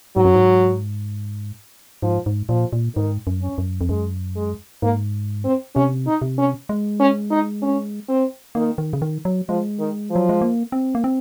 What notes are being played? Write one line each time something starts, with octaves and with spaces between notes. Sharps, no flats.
G#2 F#3
F#2
G#2
G#2 F3
G#2
A#2 F3
A#2
G#2 D#3
F#2
C#4
F#2
F2
F#2 G#3
G#3
G#2 A#3
C4
C3 C#4
D#4
C3
C#4
G#3
C#4
D#4
C#4
C4
D#3 A#3
D#3
C#3
D#3
F#3
F3 G#3
D#3
F3
F#3
G#3
A#3
C4
A#3
C4